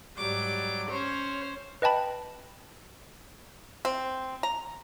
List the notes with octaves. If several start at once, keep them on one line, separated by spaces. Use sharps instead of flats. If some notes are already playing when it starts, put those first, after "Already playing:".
G#2 F#3 G3 D6
C#4 C5 C#5
B4 D#5 G5 A5 B5
C4
A#5